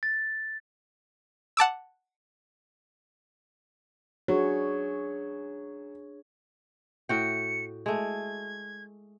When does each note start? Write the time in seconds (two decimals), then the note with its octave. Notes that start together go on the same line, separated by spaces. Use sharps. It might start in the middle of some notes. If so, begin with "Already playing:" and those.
0.03 A6
1.57 F#5 A5 D6 E6
4.28 F#3 D4 G#4 C#5
7.09 A2 F#4 G5 C#7
7.86 G#3 A3 G#6